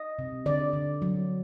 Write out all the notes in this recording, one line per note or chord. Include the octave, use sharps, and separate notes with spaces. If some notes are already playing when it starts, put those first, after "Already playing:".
Already playing: D#5
C3
D3 D5
D3
F#3